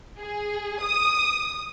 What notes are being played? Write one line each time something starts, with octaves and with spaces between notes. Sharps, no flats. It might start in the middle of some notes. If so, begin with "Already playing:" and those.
G#4
D#6